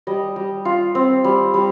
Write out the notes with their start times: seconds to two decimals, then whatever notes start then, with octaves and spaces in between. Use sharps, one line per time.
0.07 G3 D#5
0.36 G3
0.65 F4
0.95 C4
1.24 G3
1.54 G3